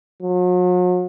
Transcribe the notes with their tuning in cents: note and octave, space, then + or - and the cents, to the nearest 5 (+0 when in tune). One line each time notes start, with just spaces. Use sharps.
F#3 -45